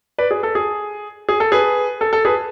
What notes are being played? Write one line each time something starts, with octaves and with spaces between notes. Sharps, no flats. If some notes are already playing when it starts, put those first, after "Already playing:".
B4 D5
G#4
A4
G#4
G#4
A4
G#4 B4
A4
A4
G#4 B4